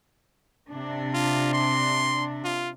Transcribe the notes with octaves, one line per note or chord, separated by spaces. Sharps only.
C3 D4
F4
C6
F4